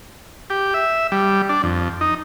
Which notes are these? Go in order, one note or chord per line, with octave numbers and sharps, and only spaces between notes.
G4
E5
G3
D4
F2
D#4